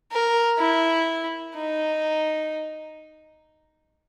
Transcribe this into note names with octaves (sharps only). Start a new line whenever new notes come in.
A#4
E4
D#4